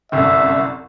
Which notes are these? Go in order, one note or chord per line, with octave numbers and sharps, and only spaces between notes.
G1 C2 F#2 E5